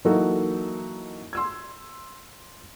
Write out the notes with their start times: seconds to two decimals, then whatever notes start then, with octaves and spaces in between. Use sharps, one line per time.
0.05 E3 F#3 A#3 D#4 F#4 A4
1.33 C6 E6 G#6